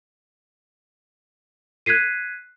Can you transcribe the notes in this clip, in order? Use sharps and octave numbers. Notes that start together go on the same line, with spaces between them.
F#6 G#6 B6 C7 D#7